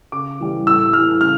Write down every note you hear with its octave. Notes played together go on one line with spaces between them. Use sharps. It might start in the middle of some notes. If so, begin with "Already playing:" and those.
C#3 D6
E3 G3
A2 E6
E3 G3 F6
C#3 F6